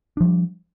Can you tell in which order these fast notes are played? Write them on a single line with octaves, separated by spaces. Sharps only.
D4 F3 G3